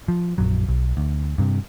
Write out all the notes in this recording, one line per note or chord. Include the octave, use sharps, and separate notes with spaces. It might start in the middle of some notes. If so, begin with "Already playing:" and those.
F3
A#1 F#2 F#3
B1
D2
G2 C3